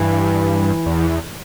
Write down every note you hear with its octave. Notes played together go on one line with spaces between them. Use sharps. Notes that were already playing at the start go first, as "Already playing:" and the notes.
Already playing: G2 E3
E2